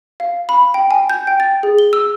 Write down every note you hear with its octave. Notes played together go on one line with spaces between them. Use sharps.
F5
B5
G5
G#5
G6
G5
A6
G#4
G7
E6